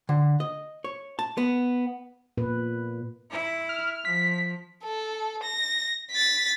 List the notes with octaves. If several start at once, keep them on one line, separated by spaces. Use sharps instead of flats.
D3
D#5
C#5
A5
B3
A#2 B4
E4
F6
F3 B6
A4
A#6
A6 B6